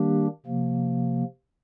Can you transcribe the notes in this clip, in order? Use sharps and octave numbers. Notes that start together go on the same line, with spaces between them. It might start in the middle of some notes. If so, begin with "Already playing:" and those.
Already playing: D#3 G3 A#3 D4 G4
C3 F3 A#3